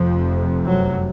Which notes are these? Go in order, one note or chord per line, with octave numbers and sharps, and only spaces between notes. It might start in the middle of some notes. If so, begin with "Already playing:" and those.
Already playing: F1 F2 C3 F3
F#2 F#3